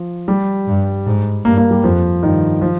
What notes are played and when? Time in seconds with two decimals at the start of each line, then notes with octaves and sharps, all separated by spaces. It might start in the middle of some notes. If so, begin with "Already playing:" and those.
Already playing: F3
0.28 G3
0.67 G2
1.06 G#2
1.45 G2 A#3
1.57 A#3
1.71 G3
1.84 F2 F3
2.22 G2 D#3
2.62 F3